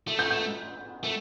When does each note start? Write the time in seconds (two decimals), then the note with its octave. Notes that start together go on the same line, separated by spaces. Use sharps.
0.08 A3
0.19 G6
0.31 G6
1.04 A3